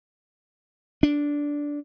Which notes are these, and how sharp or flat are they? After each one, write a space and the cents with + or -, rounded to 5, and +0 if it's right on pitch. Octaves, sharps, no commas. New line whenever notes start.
D4 -10